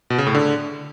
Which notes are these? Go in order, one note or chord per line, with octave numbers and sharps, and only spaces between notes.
B2
C#3
A2
D3